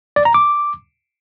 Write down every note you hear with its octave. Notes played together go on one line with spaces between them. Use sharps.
D5
A#5
D6